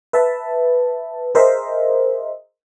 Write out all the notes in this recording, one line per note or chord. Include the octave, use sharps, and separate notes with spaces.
B4 E5 A5
G#4 A#4 C5 D#5 E5